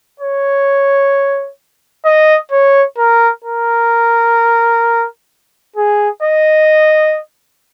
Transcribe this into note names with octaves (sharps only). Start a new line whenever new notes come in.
C#5
D#5
C#5
A#4
A#4
G#4
D#5